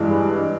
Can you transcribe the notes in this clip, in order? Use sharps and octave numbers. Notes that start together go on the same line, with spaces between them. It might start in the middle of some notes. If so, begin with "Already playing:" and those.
Already playing: G2 E3 G#3